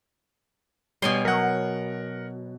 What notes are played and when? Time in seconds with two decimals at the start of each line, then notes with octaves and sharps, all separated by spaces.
1.02 B2 G3 C#5 G#5 C6
1.25 F#3 A#4 F#5